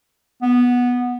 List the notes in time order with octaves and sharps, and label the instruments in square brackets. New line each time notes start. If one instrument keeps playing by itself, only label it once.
[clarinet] B3